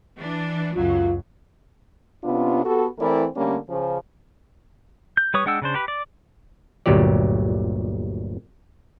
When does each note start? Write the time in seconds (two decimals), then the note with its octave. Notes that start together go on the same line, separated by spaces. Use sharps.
0.18 E3 D4
0.75 C#2 F#2 F#3 F4
2.24 C3 B3 C#4 D4 F4
2.65 B3 F#4 G4 A4
2.99 E3 A3 C4 E4 A#4 D5
3.36 D3 G3 A3 A#3 C#4
3.69 C#3 F3
5.17 G6
5.34 G3 B4 C#5 C#6 D#6
5.46 G#3 D4 F#5 G5 E6
5.62 C#3 D4 C5
5.74 G4 B4
5.88 D5
6.86 G1 D2 A#2 F#3 G4 D5